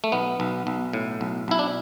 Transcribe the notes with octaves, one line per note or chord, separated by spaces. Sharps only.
A3
B1 B3
B1
B1
A2
B1
B1 E4
D4